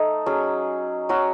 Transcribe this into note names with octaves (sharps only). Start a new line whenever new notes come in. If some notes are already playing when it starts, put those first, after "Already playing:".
Already playing: A3 D#4 A4 D#5
F#3 C#4 G#4
F#3 C#4 F#4